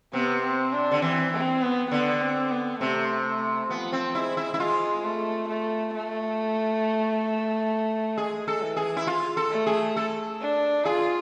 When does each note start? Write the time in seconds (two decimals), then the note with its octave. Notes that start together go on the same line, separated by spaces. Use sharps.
0.13 C3 B3
0.43 C4
0.73 D4
0.91 D3
1.02 E3 C4
1.32 C4
1.62 B3
1.91 D3 B3
2.21 C4
2.51 B3
2.81 C3 A3
3.26 A3
3.70 F3 B3
3.92 C4
4.15 G#3 E4
4.37 E4
4.54 E4
4.59 G#3 F4
5.04 A3
5.49 A3
5.94 A3
8.17 G#3 G#4
8.48 A4
8.62 E3
8.76 G#4
8.97 E4
9.07 F4
9.37 A4
9.51 A3
9.66 G#4
9.96 A4
10.41 D4
10.85 F4 G#4